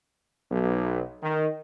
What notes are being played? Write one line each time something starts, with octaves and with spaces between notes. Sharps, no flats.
B1
D#3